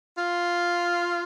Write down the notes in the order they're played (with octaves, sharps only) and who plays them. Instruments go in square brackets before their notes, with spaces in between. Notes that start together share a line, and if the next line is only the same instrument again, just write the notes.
[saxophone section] F4